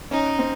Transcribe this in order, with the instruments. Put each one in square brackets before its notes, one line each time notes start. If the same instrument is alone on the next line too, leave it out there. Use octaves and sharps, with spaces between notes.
[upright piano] C#4 [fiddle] D#4
[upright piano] C4